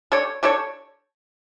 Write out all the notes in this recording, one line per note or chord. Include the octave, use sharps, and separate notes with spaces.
G3 D4 A4 C#5
G3 D4 A4 C#5